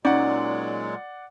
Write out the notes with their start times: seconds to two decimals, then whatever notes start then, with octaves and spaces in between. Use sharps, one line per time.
0.05 A#2 F#3 G#3 C#4 D#4 D5 F#5